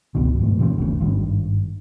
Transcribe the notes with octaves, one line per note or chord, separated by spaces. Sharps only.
G1 C#2 B2 D#3
G#2 F#3 A3
B2 D3 E3 C4
F#1 D2 C#3
G#1 G2 D#3